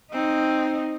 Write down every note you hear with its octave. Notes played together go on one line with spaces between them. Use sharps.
C4 D#4